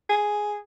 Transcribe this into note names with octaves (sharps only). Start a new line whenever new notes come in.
G#4